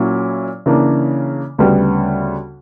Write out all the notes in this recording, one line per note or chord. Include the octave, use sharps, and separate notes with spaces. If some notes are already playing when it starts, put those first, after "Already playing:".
Already playing: A#2 F#3 C#4 E4
C#3 E3 A#3 D4
D2 C#3 G3 B3